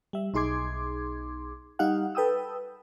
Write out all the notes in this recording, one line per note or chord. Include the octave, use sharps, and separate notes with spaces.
G3 E5
B1 D#4 G#4 C6 D6 G#6
G3 D#4 G4 F5 F#5
A4 B4 G5 D#6 E6